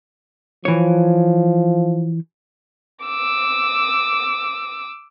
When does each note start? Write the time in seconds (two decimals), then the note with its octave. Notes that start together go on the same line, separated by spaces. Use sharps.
0.65 E3 F3 C#5
3.05 D6 E6